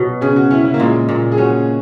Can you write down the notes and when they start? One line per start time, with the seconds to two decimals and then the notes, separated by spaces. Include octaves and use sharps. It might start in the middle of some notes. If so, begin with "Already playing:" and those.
Already playing: B2 F#3
0.21 C#3 G#4
0.36 F#4
0.51 C#4 E4
0.65 E4
0.74 A#3
0.79 A#2 G#3
1.09 A#2
1.32 G#4
1.38 C#4 F#4